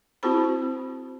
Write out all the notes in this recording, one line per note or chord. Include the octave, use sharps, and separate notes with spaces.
C4 E4 F#4 G#4 C5 B5